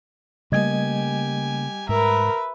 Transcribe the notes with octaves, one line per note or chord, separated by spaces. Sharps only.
C#3 G3 A3 A#3 G4 D#5 G#5 G#6
G#2 A#4 B4 E5